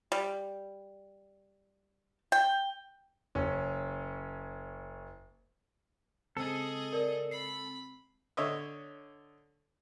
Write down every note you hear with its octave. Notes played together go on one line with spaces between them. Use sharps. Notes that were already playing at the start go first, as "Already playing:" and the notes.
G3
G5
F#1 C#4
C#3 G#3 C4 G#4 A4 D#5
A#4 D5
B5 C7
D3 C#5 D#5 E5